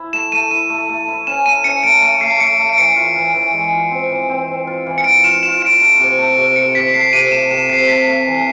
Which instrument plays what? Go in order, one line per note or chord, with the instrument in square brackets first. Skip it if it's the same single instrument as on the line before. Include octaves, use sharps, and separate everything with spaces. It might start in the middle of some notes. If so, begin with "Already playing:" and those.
Already playing: [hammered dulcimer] E4
[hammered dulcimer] A3 [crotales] E7
[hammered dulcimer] A3 [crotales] D#7
[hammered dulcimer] E4 [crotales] D#7
[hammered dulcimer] A3
A3
E4
[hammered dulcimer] C#4 [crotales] E7
[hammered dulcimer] A3 [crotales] D#7
[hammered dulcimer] C#4 [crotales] C#7
[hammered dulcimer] A3 [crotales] D7
[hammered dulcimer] A3 [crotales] C#7
[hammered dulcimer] A3 [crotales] C7
[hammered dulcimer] A3 [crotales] C#7
[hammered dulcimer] A3
[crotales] D7
[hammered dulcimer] E3 [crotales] C#7
[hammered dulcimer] F4
E3
E3
G#3
F4
C4
E3
C4
C4
F4
E3
[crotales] C#7
[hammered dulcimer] F4 [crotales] D7
[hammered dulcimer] F4 [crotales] E7
[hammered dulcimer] F4 [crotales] E7
[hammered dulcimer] F4 [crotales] D7
[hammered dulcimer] A3 [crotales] D7
[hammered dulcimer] C3
A3
C3
[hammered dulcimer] C3 [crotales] C#7
[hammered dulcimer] C3 [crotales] B6
[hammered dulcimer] A3 [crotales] C7
[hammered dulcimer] C3 [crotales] D#7
[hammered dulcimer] A3 [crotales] E7
[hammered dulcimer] C3 [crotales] E7
[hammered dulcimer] C3 [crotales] C7
[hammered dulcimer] A3 [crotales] B6
[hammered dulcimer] A3
E3